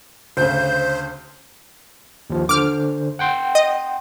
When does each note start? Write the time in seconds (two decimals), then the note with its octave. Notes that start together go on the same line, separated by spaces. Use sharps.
0.37 D2 C#3 C5 G6
2.30 D#2 F3
2.49 D3 C5 D6 F6
3.19 F#5 G5 C6
3.55 D#5